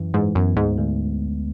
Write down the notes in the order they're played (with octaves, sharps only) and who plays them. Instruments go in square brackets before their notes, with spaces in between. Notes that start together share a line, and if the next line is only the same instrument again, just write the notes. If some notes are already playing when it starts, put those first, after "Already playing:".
Already playing: [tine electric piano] F#2 E3
[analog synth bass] G#2 [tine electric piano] E3
[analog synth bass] F#2 [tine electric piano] B3
[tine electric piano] D2 [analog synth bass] G#2
[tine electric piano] D2